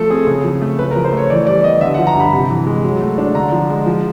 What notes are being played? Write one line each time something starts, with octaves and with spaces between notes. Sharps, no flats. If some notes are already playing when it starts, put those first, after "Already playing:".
Already playing: F3 A3 A4
C4 G#4
C#3
F3
A3
C#3 B4
A#4
F3
C5
A3 C#5
E3 D5
G3 D5
B3 D#5
D3 E5
F#5
F3
A#5
G2 B5
C3
E3
G#3
F#3
A3
D4
D3 A#5
F3
G#3
F3